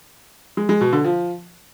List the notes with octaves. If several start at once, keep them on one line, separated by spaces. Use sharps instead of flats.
G#3
G#3
B2
D3
F3